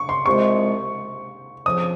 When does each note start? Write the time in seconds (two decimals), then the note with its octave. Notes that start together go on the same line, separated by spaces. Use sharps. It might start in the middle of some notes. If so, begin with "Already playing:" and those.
Already playing: C#6
0.09 C6
0.26 C2 C3 F3 G#3 C#6
1.66 F2 C#3 F3 D#6